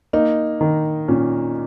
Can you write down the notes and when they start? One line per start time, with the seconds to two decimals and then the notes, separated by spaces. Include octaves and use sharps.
0.13 A#3 D#4
0.61 D#3
1.08 A#2 C#4